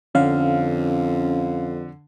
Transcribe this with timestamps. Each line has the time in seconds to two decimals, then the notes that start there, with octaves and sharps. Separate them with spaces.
0.15 F2 D3 C#4 F5